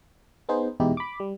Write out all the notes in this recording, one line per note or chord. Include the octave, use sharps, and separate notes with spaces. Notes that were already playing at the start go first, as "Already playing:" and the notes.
B3 D#4 G#4 C5
E2 B2 G#3 D#4 E4 G4
B5 D6
G3